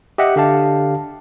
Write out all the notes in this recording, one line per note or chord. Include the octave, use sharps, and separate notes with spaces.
G4 D#5 E5 F#5
D3 G4 F5 A5